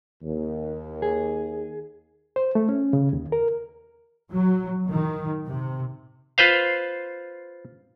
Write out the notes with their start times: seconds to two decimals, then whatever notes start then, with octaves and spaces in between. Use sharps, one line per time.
0.22 D#2
1.02 G#4
2.36 C5
2.55 A3
2.69 C#4
2.93 C#3
3.13 D#2
3.32 A#4
4.33 F#3
4.88 D#3
5.47 C3
6.38 F4 B4 C5 F5